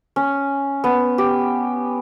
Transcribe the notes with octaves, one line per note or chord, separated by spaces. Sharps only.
C#4
B3
G4